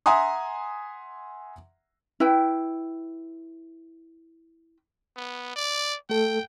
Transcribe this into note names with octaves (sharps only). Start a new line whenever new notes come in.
E5 F#5 G#5 A#5 C6 D#6
E4 B4 G5
B3
D5
A3 A4 G5